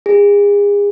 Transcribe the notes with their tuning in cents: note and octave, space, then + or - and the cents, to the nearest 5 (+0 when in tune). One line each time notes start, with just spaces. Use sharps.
G#4 -35